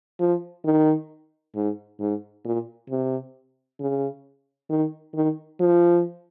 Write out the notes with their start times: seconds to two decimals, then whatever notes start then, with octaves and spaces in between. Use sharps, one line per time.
0.20 F3
0.65 D#3
1.55 G#2
2.00 G#2
2.45 A#2
2.89 C3
3.80 C#3
4.70 D#3
5.15 D#3
5.60 F3